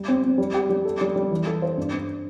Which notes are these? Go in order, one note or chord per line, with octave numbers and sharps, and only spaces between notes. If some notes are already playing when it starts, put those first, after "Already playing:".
Already playing: G3
C4
C4
G3
G4
G3
A4
G3
G3
E3
A4
C5
G2
G2